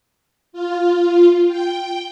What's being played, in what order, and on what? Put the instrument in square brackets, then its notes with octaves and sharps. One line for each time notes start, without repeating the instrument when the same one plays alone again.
[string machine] F4
G5